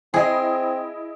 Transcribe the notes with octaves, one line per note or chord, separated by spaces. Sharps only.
C4 E4 G#4 D#5